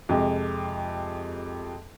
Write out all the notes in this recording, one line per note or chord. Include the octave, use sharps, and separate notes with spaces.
F2 C3 G#3